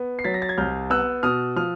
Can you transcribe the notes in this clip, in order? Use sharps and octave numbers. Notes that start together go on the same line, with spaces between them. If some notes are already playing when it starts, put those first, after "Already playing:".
Already playing: B3
C7
F#3 A6 B6
A#6
A6
G#6
C2 F6 G6
B3 E6 F#6
B2 D#6 F6
F3 D#6 F6